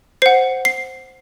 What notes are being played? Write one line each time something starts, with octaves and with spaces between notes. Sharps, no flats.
C5 F#5 C7
C7